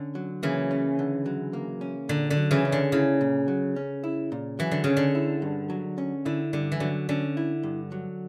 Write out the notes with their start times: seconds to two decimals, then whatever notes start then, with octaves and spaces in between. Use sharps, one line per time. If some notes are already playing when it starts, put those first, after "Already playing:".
Already playing: D3 C#4
0.15 F#3
0.43 C#3 E3 A#3
0.71 C#4
0.99 D3
1.26 F#3
1.53 A#3
1.81 C#4
2.09 A#2 D3
2.30 D3
2.37 F#3
2.51 C#3 E3
2.65 C#4
2.72 D3
2.92 C#3 E4
3.21 A#2
3.48 F#3
3.76 C#4
4.04 E4
4.32 A#2
4.59 E3 F#3
4.71 D3
4.84 C#3 C#4
4.97 D3
5.15 E4
5.42 G2
5.70 F#3
5.98 C#4
6.25 D3 E4
6.53 G2 D3
6.72 E3
6.80 D3 F#3
7.09 D3 C#4
7.37 E4
7.63 G2
7.92 F#3